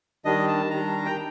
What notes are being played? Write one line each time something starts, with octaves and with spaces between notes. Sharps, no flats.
D#3 G3 D4 D#5
A5
D#3 G3 D4 A#5
G5